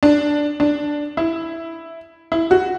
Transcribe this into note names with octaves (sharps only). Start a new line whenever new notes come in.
D4
D4
E4
E4
F#4